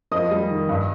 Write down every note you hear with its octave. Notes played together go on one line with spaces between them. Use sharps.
F2 D#5 D#6
G3
D#3
G2